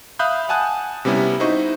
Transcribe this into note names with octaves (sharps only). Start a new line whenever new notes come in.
E5 F5 B5 D#6 F#6 G6
F#5 G#5 A5 D#6 F#6
C3 G3 B3 C#4 E4
D#4 E4 F#4 C5 D#5 C#6